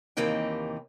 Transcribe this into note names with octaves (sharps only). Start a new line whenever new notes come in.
D#2 C3 E3 A#3 D#4 G5